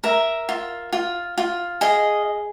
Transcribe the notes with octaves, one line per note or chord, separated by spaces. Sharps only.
A#4 E5
F4
F4
F4
G#4 D#5